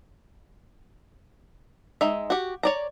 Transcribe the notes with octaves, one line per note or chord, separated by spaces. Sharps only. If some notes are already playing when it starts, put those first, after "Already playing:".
G#3 D#4 E5
F#4 G4
C#5 D5 A#5